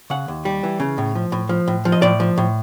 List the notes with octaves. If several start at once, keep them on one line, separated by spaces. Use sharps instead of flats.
C#3 F#5
D#2
G3
E3
C#3
A2
F3
A2
F3
A2
F3
D#5
A2 D5
F3
A2